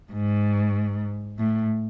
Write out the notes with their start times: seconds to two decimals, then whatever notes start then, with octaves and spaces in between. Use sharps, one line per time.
0.12 G#2
1.38 A2